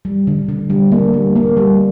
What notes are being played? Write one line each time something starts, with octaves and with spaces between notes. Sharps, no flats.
G3
D3
D3
G3
A#3
G3
A#3
G3